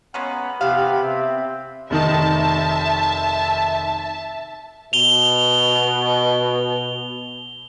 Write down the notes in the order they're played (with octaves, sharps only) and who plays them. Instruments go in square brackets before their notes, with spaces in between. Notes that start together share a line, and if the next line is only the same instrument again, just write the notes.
[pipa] G#3 A#3 C#4 [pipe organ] B3 B5
[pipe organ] C3 B3 B5 [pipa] E3 F5 [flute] G4
[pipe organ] C4 [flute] E5
[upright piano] F1 D#3 D#4 [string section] E5 A5
[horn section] B2 [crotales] F7 G7